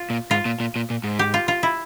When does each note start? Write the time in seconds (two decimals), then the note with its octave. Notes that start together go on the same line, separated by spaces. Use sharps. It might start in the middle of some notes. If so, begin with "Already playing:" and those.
Already playing: F4
0.10 A#2
0.31 G#2 F4
0.45 A#2
0.60 A#2
0.76 A#2
0.90 A#2
1.04 G#2
1.19 G4
1.34 F4
1.48 F4
1.63 E4